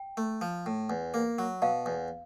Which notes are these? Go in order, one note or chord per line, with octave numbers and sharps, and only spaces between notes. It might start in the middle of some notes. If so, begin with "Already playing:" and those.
Already playing: G5
A3
F3
A2
E2
A#3
F#3
B2 F5
E2